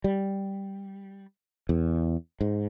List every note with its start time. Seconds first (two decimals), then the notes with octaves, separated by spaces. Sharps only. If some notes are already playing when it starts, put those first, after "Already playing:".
0.04 G3
1.69 E2
2.41 G#2